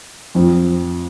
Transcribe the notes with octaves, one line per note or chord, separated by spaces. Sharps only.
F2 F3 C4